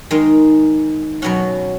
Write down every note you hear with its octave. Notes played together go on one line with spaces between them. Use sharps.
D#3 G#3 D#4
B2 F#3 C#4 F#5